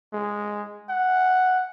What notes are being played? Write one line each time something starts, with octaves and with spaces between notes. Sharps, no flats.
G#3
F#5